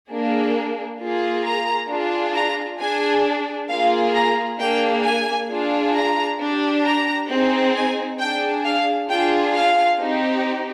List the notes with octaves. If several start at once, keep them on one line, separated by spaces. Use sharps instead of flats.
A#3 D4 G#4
A#3 F4 G#4
A#5
D4 F4 G#4
A#5
D4 G#4 G#5
A#3 F4 G#4 F5
A#5
A#3 D4 G#4 G5
G#5
D4 F4 G#4
A#5
D4 G4
A#5
C4 D#4 G#4
G#5
D4 G#4 G5
F5
D4 F4 G#4 G5
F5
C4 D#4 G4